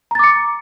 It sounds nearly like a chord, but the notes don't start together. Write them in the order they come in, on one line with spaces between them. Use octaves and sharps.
A#5 A6 D6 C#7